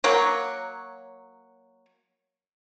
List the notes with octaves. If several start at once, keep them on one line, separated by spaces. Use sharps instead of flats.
F#3 A#3 C#5